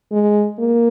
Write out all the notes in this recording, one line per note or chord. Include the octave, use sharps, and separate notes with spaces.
G#3
A#3